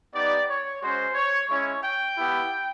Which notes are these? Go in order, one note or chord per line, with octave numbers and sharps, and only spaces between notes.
B3 D#4 G4 D5
C#5
G#3 C#4 F#4 C5
C#5
G#3 C#4 E4 C#5
G5
B3 E4 G4